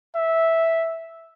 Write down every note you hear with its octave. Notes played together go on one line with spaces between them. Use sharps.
E5